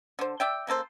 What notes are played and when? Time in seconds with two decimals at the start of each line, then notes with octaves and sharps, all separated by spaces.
0.19 D3 C5
0.40 D5 E5 G5
0.67 C#3 A#3 A4 C5